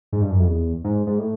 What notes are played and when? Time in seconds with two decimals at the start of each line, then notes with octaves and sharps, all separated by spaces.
0.13 G#2
0.22 G2
0.30 F#2
0.40 F2
0.48 E2
0.84 G#2
1.07 G#2
1.19 A2